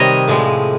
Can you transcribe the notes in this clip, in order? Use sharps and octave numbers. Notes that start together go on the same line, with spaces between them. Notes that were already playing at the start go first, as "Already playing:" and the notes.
Already playing: C3 D#3 G3 C4 C#5 D#5
A2 F3 G#3